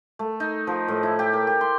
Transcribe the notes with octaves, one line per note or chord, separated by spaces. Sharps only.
A3
D#4
F3
A2
E4
G4
A#4
G4
C6